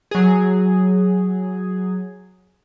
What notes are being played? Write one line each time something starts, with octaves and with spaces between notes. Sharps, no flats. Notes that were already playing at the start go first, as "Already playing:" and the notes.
F#3 G#4